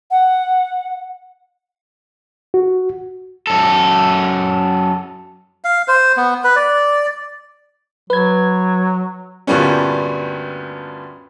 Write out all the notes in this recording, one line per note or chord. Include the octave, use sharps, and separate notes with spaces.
F#5
F#4
F#2 A4
F5
C5
B3
B4
D5
F#3 B4 G#6
D2 G2 A#2 G3 B3 C#4